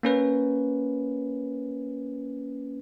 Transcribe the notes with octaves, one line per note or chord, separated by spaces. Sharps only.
A#3 C#4 B4